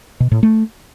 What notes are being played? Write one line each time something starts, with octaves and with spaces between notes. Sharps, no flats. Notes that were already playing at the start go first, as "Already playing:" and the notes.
B2
A2
A3